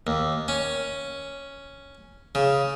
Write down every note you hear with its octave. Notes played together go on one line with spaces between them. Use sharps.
D#2
C#4
C#3